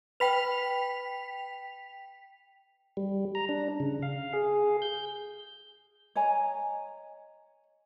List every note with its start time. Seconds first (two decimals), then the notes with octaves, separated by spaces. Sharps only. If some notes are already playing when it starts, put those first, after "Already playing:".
0.20 B4 G5 B5 B6 F7
2.97 G3
3.35 A#5
3.49 D4
3.80 C#3
4.03 F5
4.33 G#4
4.82 G6
6.15 C#5 D#5 G#5 A#5